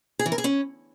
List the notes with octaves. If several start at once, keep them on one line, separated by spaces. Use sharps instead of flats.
G#4
E3
A#4
G#4
C#4